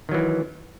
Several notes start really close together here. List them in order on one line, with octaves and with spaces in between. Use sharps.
D#3 F#3 E3